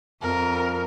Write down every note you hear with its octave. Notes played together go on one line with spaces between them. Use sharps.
F2 A#4